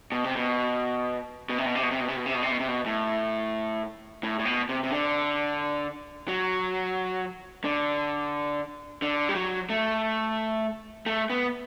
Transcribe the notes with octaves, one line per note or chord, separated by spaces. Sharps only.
B2
C3
B2
B2
C3
B2
C3
B2
C3
B2
C3
B2
C3
B2
C3
B2
C3
B2
A2
A2
A2
B2
C3
C3
D3
F#3
D3
D3
G3
F#3
A3
A3
B3